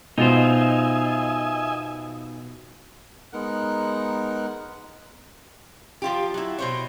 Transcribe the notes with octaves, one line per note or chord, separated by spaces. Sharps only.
B2 D#4 F4 C5 D#5 E5 G#5
G#3 B3 D#4 A#4 F#5 F#6
F3 F4 G4
F#3 E4
B2 C5 C#5